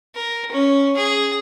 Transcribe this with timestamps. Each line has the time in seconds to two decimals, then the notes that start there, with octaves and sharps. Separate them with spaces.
0.15 A#4
0.52 C#4
0.97 G#4